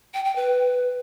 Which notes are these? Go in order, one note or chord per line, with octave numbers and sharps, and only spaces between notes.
G5
G5
B4